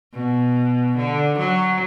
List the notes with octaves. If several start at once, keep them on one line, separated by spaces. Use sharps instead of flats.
B2
D3
F#3